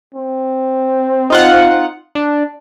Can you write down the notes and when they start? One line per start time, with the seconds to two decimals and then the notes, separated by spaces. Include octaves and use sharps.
0.15 C4
1.30 D#4 F4 F#5
2.15 D4